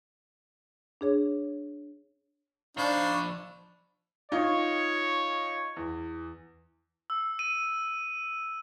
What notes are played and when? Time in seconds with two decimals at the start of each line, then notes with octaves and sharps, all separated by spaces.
1.01 D4 G#4 C#5
2.77 F3 D4 D#4 C5 F5 B5 C#6
4.32 D#4 F4 C#5
5.76 E2
7.10 E6
7.39 D#7